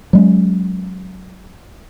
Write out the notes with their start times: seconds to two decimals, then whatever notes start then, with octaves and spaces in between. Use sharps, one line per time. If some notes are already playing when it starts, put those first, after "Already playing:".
0.13 F#3 G#3 C#4